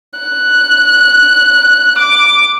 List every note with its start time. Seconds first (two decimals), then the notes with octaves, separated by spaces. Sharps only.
0.19 F#6
1.99 D6